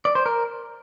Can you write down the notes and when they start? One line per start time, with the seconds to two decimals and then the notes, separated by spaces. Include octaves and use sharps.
0.05 D5
0.15 C5
0.26 A#4